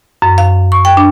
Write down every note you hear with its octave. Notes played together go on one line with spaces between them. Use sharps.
F#2
F5
C#6
G5
D4